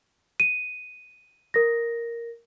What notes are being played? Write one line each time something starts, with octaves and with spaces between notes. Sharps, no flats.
D#7
A#4 A#6